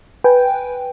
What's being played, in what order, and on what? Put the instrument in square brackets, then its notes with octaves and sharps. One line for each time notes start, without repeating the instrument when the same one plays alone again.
[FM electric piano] B4 G5 G#5